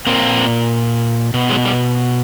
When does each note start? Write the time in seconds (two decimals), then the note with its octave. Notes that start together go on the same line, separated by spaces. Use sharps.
0.07 A#2 A#3 C4
1.34 B2
1.50 F#3 G#3
1.65 G3